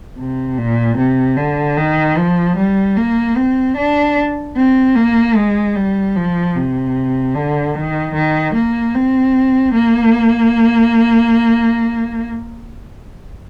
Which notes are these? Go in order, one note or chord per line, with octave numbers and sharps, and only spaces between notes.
C3
A#2
C3
D3
D#3
F3
G3
A#3
C4
D4
C4
A#3
G#3
G3
F3
C3
D3
D#3
D#3
A#3
C4
A#3